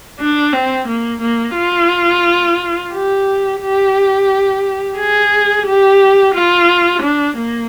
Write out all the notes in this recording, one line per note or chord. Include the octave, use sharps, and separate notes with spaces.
D4
C4
A#3
A#3
F4
G4
G4
G#4
G4
F4
D4
A#3